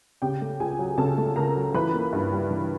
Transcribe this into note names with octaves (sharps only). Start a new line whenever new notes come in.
C#3 G4 G5
A3
C#2 G#4 G#5
F#3
C#3 A4 A5
A3
C#2 A#4 A#5
F#3
E3 B4 B5
A#3
G2
G3
E3